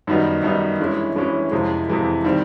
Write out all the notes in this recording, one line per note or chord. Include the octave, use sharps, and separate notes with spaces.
F#2 D#3 G3 B3 D#4
F#2 D#3 G3 B3 D#4
G2 E3 G#3 C#4 E4
G2 E3 G#3 C#4 E4
F2 C3 E3 G#3
F2 C3 E3 G#3
D#3 G3 C4